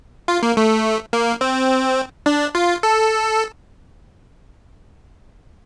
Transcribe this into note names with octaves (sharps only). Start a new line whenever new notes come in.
F4
A#3
A3
A#3
C4
D4
F4
A4